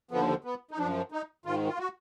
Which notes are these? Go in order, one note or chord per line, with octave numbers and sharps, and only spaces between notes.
D#2 D3 F3 B3
B3
D#4
F#2 F3 D4
D#4
G#2 D#3 F4
F4
F#4